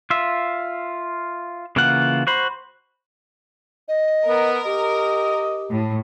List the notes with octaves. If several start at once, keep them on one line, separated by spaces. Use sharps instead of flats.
F4 E5
C#3 E3 A#3 F4 F#5
F#4 C5 B5
D#5
B3 A#4
G4 D#5
A2